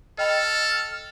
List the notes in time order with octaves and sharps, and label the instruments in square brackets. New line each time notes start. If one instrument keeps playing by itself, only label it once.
[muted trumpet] A4 [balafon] D#5 G5 B5 [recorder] F6